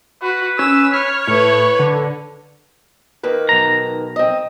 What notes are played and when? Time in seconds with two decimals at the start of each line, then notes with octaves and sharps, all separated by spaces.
0.23 F#4 B4
0.59 C#4 E6
0.94 C#5 F6
1.27 A2 B4 C#6
1.79 D3
3.23 D#3 A#3 B4
3.49 B1 A#5
4.16 C4 D#5